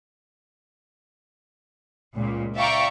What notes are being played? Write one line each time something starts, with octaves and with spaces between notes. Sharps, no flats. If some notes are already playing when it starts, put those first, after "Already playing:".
C#2 A#2
D5 E5 F5 G5 A#5 C#6